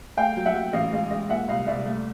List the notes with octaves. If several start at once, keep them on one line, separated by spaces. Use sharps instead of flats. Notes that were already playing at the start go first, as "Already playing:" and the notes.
A3 F5 G5
F#3
E5 F#5
F#3
A1 D#5 F5
G#3 D#5 F5
G#3 D#5 F5
A#2 E5 F#5
C2 D#5 F5
C2 D5 E5
A3